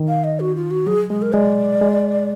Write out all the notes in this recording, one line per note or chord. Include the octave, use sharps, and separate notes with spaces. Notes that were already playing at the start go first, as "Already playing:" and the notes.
Already playing: D#3
F5
D#5
F#4
F4
F#4
F#3 G#4
G#3 G#4
A#4
G#3 D5
G#3